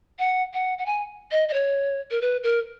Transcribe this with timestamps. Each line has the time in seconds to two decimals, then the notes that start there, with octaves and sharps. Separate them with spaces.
0.19 F#5
0.54 F#5
0.78 F#5
0.86 G#5
1.32 D#5
1.49 D#5
1.53 C#5
2.11 A#4
2.21 B4
2.43 A#4